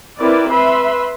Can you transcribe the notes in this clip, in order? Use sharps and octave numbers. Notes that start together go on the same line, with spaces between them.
C4 E4 A#4 B4 D5
B4 E5 B5 C6